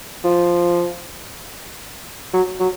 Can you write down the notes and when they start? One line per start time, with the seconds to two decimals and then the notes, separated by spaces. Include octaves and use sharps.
0.24 F3
2.34 F#3
2.60 F#3